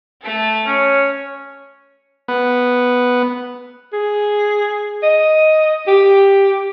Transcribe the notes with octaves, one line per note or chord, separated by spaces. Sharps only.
A3 A4
C#4 C#5
B3
G#4
D#5
G4